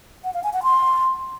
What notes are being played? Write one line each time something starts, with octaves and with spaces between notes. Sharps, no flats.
F#5
F5
G#5
F#5
C6